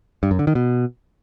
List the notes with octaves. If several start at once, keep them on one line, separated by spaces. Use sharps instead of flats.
G2
F#2
D3
D#3
B2